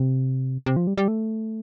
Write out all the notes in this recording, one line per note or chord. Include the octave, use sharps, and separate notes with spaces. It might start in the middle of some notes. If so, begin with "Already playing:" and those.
Already playing: C3
C3
F3
G3
G3
A3